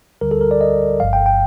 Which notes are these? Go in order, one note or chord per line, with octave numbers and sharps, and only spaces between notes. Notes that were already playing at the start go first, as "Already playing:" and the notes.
D2 D3 G3 A#4
A4
A#4
D5
D#5
G1 G2 F3 F5
G5
G5